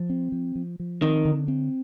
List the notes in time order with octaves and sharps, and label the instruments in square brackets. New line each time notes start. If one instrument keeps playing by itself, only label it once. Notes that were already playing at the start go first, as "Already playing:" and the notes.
Already playing: [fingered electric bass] F3
C4
F3
F3
F3
[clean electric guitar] D#3 [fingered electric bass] C4
[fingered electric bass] D3
C4